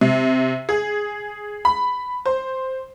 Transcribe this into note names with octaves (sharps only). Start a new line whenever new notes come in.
C3
G#4
B5
C5